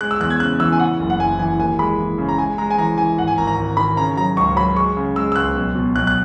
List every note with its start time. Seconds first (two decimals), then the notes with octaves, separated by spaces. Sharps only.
0.01 G#3 F#6
0.11 E6
0.20 E2 F#6
0.30 G#6
0.40 C#3 F#6
0.60 E3 E6
0.72 G#5
0.80 C#3 F#5
1.00 F#1
1.10 F#5
1.20 F#1 G#5
1.39 E3 G#5
1.59 D#2 G#5
1.79 G#3 B5
1.99 E3
2.18 C#3
2.29 A#5
2.38 G#3 G#5
2.58 G#3 A#5
2.70 G#5
2.78 E3 A#5
2.98 E3 G#5
3.18 G#1 F#5
3.27 G#5
3.37 G#1 A#5
3.47 A#5
3.57 G#1
3.77 D#3 B5
3.97 C#3 A#5
4.17 F#3 A#5
4.36 C#2 C#6
4.56 F#3 B5
4.76 G#3 C#6
4.97 C#3
5.16 G#3 E6
5.32 E6
5.36 C#2 F#6
5.55 B1
5.75 B2
5.95 B1 F#6
6.07 F#6